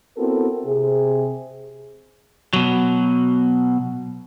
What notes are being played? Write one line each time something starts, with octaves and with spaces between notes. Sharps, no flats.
B3 C4 E4 F#4 A4 A#4
C3 G#4
B2 F#3